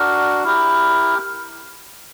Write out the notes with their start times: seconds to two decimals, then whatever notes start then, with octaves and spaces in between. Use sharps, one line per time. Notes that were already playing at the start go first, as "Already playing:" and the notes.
Already playing: D4 F#4 A#4
0.44 E4 G4 A#4